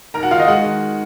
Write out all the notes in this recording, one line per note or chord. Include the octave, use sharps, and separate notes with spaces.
D#2 A#4 A#5
F#4 F#5
D#3 F4 F5
D#4 D#5
G#3 F#4 F#5
D#3